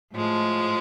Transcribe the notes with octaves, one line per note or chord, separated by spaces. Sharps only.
A2 F3 G#3